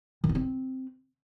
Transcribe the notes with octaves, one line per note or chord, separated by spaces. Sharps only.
D#3
B3
C4